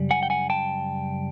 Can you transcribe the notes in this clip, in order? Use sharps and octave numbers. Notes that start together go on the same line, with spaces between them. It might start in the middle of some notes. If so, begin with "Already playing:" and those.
Already playing: F#2 C#3 G3
F#5 G#5
G5
F#5 G#5
G5 A5